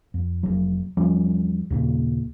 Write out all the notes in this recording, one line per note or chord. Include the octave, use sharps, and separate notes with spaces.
F2
F1 B1 F#3
E2 F3 G3 C#4
D#2 A#2 C#3